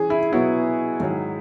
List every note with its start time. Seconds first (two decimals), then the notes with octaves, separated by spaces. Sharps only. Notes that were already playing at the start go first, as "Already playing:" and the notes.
Already playing: E3 C#4 G#4
0.10 E4
0.32 B2 F#3 B3 E4 F#4
1.00 G#2 D#3 F#3